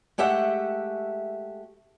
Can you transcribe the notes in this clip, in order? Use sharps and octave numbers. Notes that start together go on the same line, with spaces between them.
G#3 A3 G4 E5 F#5